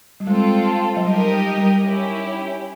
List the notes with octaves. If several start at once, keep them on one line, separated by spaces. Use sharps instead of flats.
G3
G#3 C4 F4 A4
F#3
G3 D#4 G4 A#4 D#5
G3
G3
C#4 E4 G4